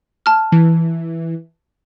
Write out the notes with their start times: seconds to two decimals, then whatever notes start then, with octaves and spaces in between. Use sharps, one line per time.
0.26 A5 F6
0.52 E3